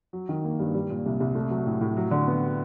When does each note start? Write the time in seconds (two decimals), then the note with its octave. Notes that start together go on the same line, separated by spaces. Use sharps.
0.13 F#3
0.29 D#3
0.45 A#3
0.59 G2
0.74 G3
0.90 A#2
1.06 C2
1.20 C2
1.35 A3
1.50 F#3
1.67 A2
1.81 A2
1.97 F#3
2.11 D3
2.27 B3